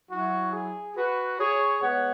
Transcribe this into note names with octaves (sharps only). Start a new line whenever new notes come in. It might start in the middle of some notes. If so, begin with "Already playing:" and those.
F#3 E4 F#4
G#4
F#4 B4
G#4 C#5
B2 G#3 B3 C#5 F#5